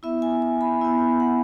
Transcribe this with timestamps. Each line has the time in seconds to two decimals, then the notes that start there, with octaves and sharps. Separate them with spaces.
0.03 B3 E4 E5
0.22 G#5
0.42 G#5
0.61 B5
0.81 B3 E4
1.20 F#5